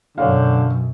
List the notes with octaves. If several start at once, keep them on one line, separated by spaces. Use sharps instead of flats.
F#2 B2 D3 C#5 F5